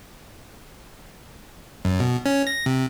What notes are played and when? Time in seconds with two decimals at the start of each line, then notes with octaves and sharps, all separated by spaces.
1.85 F#2
2.00 B2
2.26 C#4
2.47 A#6
2.66 C3